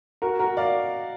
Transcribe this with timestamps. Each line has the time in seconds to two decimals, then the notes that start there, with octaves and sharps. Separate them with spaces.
0.22 F#4 A#4
0.39 F#4 A#4
0.57 D5 F5